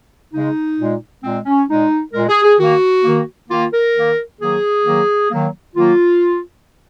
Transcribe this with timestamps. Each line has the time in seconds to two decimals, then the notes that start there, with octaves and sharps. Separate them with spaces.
0.33 C#3 G#3 D#4
0.79 A#2 G#3
1.23 A#2 G#3 C4
1.46 C#4
1.68 A#2 G#3 D#4
2.14 A#2 G#3 A#4
2.29 G#4
2.44 G#4
2.59 D#3 A#3 F#4
3.04 D#3 A#3
3.49 D#3 A#3 F4
3.73 A#4
3.95 D#3 A#3
4.40 D#3 F#3 A#3 G#4
4.85 D#3 F#3 A#3
5.31 D#3 F#3 A#3
5.75 D#3 F#3 A#3 F4